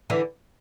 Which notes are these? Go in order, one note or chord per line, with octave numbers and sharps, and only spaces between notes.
D3 E3